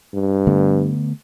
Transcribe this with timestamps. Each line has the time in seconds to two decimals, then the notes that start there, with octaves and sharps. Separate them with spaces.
0.14 G2
0.47 D3 A3 B3